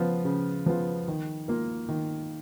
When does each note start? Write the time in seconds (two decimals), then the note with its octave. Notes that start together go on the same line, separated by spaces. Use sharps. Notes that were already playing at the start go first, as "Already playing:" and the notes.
Already playing: C#3 F3 B3 F4
0.25 C#3
0.66 F3 B3 F4
1.08 D#3
1.48 A#3 F4 A#4
1.89 D#3